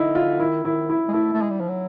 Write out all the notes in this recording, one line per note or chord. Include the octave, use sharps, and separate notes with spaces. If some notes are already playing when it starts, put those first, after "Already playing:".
Already playing: D3 D#4 E4
F4
D#3 E4
D#3 E4
E4
G#3
A3 E4
A3
G#3
G3
F3
F#3